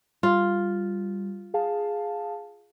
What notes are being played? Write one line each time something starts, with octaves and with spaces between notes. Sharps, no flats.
G3 F4
G#4 F5 A5